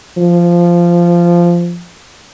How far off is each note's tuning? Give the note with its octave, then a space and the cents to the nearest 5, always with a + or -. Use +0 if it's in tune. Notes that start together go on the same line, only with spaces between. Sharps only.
F3 -10